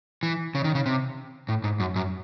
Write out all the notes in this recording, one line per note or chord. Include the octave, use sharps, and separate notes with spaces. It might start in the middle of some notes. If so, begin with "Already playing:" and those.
E3
C#3
D#3
C#3
C3
A2
G#2
F#2
F#2